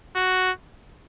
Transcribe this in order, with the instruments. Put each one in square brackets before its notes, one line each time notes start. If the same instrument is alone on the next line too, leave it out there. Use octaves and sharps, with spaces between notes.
[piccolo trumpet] F#4